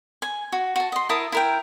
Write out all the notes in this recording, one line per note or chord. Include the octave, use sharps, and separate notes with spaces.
G#5
F#4
F#4 A5
D#5 C6
E4 A#4 A5 D#6
E4 A#4 G5